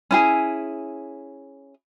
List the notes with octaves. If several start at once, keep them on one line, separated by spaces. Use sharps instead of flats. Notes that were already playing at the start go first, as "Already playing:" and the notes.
C#4 E4 G#4